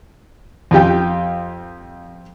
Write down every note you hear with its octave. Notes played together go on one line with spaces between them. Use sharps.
F2 F4 G4 G5